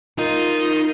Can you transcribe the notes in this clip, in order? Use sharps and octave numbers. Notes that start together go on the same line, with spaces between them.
D#4 F4 A#4 D#5